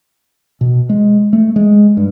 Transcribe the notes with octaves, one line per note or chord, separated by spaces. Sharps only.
B2
G#3
A3
G#3
G2